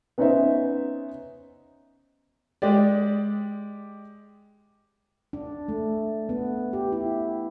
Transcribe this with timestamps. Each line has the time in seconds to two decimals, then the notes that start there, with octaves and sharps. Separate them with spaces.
0.18 B3 C#4 D#4 B4 C5 E5
2.62 G#3 G4 D5
5.33 D4
5.68 A3
6.29 B3
6.73 G4
6.92 E4